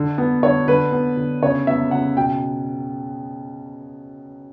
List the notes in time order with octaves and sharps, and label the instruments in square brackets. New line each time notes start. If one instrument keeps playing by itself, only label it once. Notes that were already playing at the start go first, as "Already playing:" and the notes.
Already playing: [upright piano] D3
B3
D3 C#5
D3 B4
B3
D3
C#3 C#5
B3 E5
C#3 F#5
B2 G5